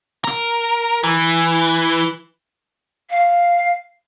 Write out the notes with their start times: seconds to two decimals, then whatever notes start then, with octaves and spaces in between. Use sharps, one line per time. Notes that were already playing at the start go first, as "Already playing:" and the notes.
0.24 A#4
1.04 E3
3.10 F5